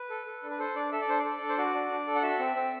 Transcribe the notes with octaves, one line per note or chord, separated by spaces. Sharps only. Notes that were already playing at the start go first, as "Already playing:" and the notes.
Already playing: B4
A4
A4
D4
B4
A4 C5
D4 D5
A4 E5
D5
D4 C5
D5
A4
D4
C5
F#4 D5
D4
D4
A4
F#5
F#4 E5
C4
C4